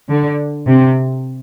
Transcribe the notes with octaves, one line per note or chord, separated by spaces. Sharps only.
D3
C3